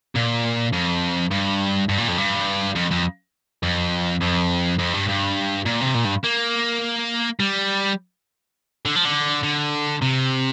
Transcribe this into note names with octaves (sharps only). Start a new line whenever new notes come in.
A#2
F2
G2
G2
A#2
F2
G2
F2
F2
F2
F2
F2
G2
G2
A#2
C3
A#2
G2
A#3
G3
D3
F3
D3
D3
C3